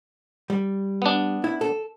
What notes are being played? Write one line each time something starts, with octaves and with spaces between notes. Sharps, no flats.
G3
B3 D4
E4
A4